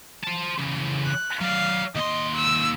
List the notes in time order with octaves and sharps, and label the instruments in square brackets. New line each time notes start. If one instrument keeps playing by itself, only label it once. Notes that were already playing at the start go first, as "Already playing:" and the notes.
[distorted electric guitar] C5 A5
C#3 E3
[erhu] F#6
[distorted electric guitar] F#3 D5 [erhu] F5
[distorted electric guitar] D#2 C6 [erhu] D#5
[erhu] E6